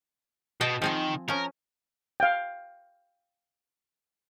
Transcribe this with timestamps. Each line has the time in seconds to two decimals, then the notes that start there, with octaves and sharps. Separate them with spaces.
0.61 B2 D#5 G5 A5
0.82 D#3 F3 C4 G#5
1.28 F3 C#4 A#4
2.20 F5 G5